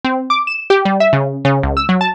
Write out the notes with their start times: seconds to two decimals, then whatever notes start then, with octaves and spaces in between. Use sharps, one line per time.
0.05 C4
0.30 D6
0.47 E7
0.70 G4
0.85 G3
1.00 E5
1.13 C#3
1.45 C#3
1.63 C#2
1.77 E6
1.89 F#3
2.01 A5